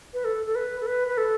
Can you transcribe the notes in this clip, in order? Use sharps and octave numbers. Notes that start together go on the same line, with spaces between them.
B4
A4
A4
B4
A4
B4
B4
A4